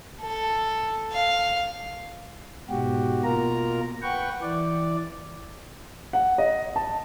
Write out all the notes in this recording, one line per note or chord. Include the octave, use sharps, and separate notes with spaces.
A4
F5
G#2 B2 F#4 G4
B2 A#3 F4 A#4 A#5
B4 F#5 G5 C#6
E3 D5
F#5
D#5
A5